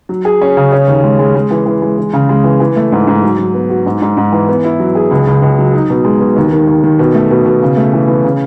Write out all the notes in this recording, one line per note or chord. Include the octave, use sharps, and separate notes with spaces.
F#3
G#4
C#4
C#3
C#4
D#2
G#3
G#3
G#3
E3
E3
G#3
E3
C#3
G#3
E3
E3
A3
G#2
G#2
F#3
F#3
B3
F#4
G#2
G#2
G#2
E3
B3
E4
F#3
G#4
C#2
C#2
C#2
F#3
D#4
B2
G#3
B2
D#2
D#3
D#2
D#3
B2
A3
B2
B2
C#3
A3
E3
E3
C#3